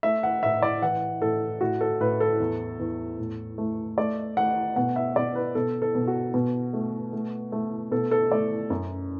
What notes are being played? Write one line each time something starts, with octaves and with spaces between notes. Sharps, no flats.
A3 E5
F#5
A2 E5
D5
E3 F#5
A2 A4
A2 F#4
A4
A2 B4
A4
E2
E2
A2
A3
A3 D5
A3 F#5
B2 F#5
E5
B2 D5
B4
B2 A4
A4
B2
F#4
B2
A3
A3
A3
B2 A4
A4
A3 D5
F#2